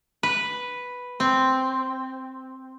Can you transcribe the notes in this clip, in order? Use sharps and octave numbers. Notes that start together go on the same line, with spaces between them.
B4
C4